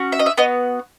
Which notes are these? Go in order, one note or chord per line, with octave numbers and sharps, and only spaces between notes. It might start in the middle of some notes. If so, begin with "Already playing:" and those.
Already playing: C#4 F#4
E5
D#5
E5
B3 F#4 D#5